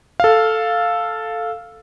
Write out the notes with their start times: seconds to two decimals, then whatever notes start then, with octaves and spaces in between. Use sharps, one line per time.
0.20 A4 F5